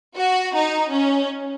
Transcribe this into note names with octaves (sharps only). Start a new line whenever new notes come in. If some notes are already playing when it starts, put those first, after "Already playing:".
F#4
D#4
C#4